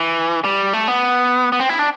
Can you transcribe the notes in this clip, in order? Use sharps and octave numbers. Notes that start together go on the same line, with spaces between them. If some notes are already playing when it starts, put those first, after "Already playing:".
Already playing: E3
G3
A3
B3
B3
C4
E4
D4